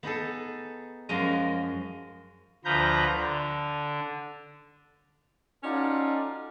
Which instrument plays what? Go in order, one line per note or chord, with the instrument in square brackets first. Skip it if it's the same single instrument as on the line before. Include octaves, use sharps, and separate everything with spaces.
[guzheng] B3 D#4 G#4 A4
F#2 F3 G#3 F#4 A#4 D#5
[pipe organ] D2 F3 B4 A#5 G6
D3
[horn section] C#4 D#4 F4 F#4 A4 D5